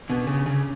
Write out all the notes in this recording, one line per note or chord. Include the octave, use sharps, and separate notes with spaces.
B2 D4
C#4
C#3
C#4
C#3 D4